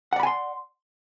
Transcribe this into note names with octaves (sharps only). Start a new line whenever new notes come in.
D5 F#5 G#5 B5 C6